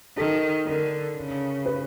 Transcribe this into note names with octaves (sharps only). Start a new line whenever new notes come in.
D#3 A4
D3 A#4
C#3
B4